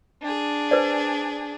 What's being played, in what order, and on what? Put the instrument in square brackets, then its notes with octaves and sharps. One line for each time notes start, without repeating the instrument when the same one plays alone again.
[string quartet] D4 G#4
[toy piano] B4 C5 D5